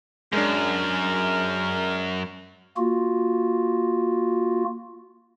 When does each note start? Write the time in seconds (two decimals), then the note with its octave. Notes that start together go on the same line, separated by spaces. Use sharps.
0.33 F#2 G#3 D4 A#4
2.77 A#3 F4 F#4